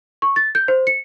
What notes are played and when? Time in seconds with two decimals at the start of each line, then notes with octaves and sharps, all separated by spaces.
0.22 C#6
0.36 A6
0.55 G6
0.68 C5
0.87 C#7